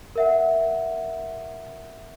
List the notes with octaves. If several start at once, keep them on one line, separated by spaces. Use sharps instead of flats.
A#4 E5 F#5